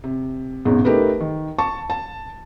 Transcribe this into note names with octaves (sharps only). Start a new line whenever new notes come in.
C3
A1 E2 G#2 B2
A3 D#4 G4 A#4 B4
D#3
A5 C#6
A5